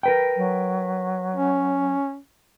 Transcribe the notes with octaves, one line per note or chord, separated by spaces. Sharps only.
A#4 B4 G5
F#3
C#4